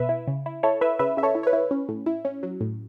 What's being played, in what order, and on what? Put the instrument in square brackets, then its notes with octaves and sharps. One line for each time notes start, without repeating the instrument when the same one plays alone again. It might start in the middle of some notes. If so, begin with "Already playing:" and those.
Already playing: [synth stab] B2 B4 E5
E4
C#3
E4
E4 A4 C#5
E4 B4 E5
C#3 B4 E5
C#3 E5
A4 C#5
E4
C#5
B4
E4
C#4
A2
E4
C#4
F#3
A2